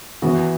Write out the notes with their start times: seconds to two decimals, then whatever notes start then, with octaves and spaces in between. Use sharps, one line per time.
0.22 E3 B3 F#4